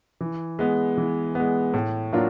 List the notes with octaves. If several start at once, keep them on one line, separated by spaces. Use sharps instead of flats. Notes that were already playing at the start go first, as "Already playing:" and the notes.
E3
G#3 B3
E3
G#3 B3
A2
F#3 A#3 D4 F4